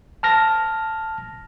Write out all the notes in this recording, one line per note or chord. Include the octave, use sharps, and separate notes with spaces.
A5 F6 A#6